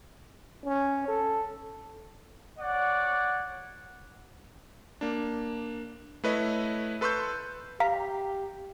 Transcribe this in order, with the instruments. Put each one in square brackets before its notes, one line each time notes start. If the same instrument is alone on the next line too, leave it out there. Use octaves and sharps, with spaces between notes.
[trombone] C#4
A4
[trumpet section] C#5 D5 F#5
[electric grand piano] A#3 D4
A3 E4 B4 C#5 D#5
A4 B4 C6 C#6 E6 G6
[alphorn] G4 [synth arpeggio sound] F5 A#5 B6